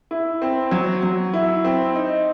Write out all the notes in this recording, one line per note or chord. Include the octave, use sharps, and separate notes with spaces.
E4
C4
F#3
F#3
E4
C4
D#4